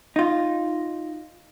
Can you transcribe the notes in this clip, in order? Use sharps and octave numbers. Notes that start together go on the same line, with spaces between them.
D#4 F4